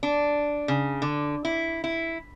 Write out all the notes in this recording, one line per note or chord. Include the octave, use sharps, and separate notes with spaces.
D4
C#3
D3
E4
E4